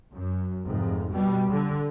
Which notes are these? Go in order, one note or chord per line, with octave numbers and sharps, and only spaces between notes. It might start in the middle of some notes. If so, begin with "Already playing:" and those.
F#2
F1 G#2
B2 G3
D3